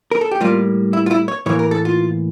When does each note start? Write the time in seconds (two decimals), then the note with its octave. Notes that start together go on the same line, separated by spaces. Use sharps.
0.11 A#4
0.21 A4
0.31 G4
0.40 A2 G3 A#3 F4
0.93 E4
1.06 F4
1.11 E4
1.28 C#5
1.46 A2 E3 A#3 C#5
1.59 A#4
1.71 A4
1.85 F4